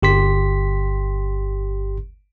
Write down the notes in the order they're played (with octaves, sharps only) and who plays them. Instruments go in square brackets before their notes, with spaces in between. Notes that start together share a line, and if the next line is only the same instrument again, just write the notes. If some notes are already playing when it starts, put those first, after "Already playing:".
[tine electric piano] G1 G4 C6 B6